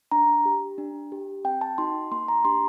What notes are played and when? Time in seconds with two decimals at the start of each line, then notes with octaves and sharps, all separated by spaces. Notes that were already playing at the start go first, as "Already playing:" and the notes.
0.11 D4 A#5
0.45 G4
0.78 D4
1.12 G4
1.45 C4 G5
1.61 A5
1.78 D#4 F#4 C6
2.11 A#3 C6
2.28 A#5
2.45 D4 G4 C6